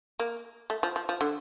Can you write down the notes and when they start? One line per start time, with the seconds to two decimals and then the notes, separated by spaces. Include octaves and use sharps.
0.19 A#3
0.70 A3
0.83 F3
0.96 F3
1.09 F3
1.21 D3